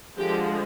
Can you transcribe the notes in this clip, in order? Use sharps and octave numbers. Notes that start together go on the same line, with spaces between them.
D3 F3 G#3 G4